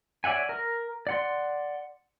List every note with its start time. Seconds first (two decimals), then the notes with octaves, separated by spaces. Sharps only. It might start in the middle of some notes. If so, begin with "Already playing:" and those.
0.24 C#5 D5 E5 F#5 G#5
0.49 A#4
1.07 D5 F#5 C6